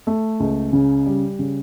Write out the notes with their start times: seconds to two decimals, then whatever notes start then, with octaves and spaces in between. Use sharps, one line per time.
0.07 A3
0.40 C#2
0.73 C#3
1.06 G3
1.39 C#3